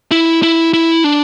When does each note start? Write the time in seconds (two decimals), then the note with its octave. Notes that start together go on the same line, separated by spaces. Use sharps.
0.11 E4
0.43 E4
0.73 E4
1.04 D4